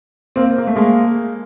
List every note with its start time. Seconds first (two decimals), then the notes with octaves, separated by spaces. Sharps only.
0.36 A#3 C4
0.58 A#3
0.67 A3
0.76 G#3 A#3